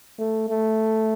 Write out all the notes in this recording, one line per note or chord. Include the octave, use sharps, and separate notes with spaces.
A3
A3